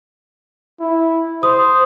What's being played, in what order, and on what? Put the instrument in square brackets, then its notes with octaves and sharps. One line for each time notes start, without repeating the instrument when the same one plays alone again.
[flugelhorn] E4
[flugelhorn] C5 [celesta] D#6